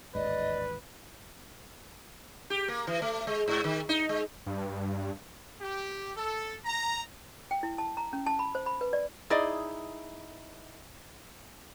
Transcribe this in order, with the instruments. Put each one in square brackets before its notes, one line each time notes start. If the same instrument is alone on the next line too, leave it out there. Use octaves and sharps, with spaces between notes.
[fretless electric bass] A1 D#2 G#2 [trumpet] B4 [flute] D5 [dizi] D#5
[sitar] G4
A#3
E3
A3
G#3
G#2
D#3
D#4
G#3
[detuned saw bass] G2
[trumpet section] G4
A4
A#5
[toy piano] G5
E4
A5
A#5
C#4
A5
B5
C5
B5
B4
D5
[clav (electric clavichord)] D#4 E4 [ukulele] G#4 D5 D#5